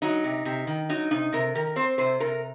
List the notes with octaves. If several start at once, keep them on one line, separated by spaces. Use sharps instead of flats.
F#3 D#4
C3
C3
D#3
F#3 D#4
C3 D#4
C3 A#4
D#3 A#4
C4 C5
C3 C5
C3 A#4